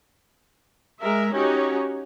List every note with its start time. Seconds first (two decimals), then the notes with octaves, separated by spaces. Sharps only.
1.02 G#3 A#4 E5
1.33 C#4 D#4 F#4 G4 C#5